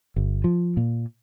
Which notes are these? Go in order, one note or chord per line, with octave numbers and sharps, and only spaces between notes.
G1
F3
A#2